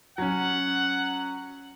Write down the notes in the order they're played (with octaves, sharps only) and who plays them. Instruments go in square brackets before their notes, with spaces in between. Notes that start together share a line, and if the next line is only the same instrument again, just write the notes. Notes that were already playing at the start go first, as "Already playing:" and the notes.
[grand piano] F#3 C#4 [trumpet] F#5